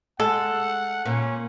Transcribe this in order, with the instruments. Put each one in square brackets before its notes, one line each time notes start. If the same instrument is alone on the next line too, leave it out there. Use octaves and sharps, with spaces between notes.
[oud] G#3 [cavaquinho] A4 [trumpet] F#5
[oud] A#2 [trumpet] C#4